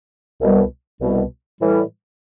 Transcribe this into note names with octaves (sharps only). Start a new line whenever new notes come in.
C2 B2 G3
C2 B2 G3
A2 E3 G3